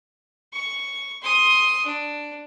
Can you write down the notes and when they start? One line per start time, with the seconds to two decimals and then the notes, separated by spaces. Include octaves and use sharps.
0.53 C#6
1.22 C6 D#6
1.86 D4